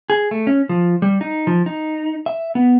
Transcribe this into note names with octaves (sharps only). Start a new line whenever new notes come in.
G#4
A3
C#4
F3
G3
D#4
F3
D#4
E5
B3